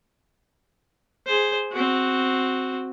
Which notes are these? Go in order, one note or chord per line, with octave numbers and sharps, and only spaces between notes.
G#4 C5
C4 F#4